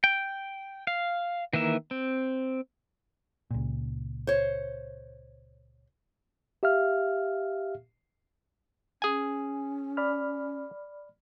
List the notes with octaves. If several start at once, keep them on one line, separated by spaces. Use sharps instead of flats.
G5
F5
D#3 E3 A#3 E5
C4
C#2 A#2
C5 C#5
G4 E5 F5 F6
C#4 G#4 G#5
D5 B5 F6